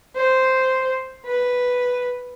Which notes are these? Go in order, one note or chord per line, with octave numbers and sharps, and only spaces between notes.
C5
B4